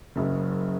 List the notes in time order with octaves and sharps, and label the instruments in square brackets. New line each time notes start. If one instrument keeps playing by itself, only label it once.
[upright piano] F#1 F#2 C#3